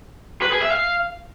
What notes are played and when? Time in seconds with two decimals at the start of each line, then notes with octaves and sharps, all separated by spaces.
0.42 B4
0.51 G#4
0.61 E5
0.71 F5